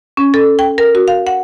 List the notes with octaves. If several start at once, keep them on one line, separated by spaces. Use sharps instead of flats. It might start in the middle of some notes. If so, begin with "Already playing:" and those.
C#4
A4
G5
A#4
F#4
F5
F#5